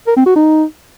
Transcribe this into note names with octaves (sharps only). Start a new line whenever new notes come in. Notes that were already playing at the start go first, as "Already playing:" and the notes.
A#4
C4
F#4
D#4